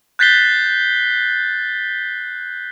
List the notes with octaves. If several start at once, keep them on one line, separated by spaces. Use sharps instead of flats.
F#6 G6 A6 B6 C7 G7